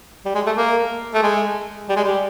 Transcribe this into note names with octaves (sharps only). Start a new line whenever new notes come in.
G3
G#3
A3
A#3
A3
G#3
G3
G#3
G3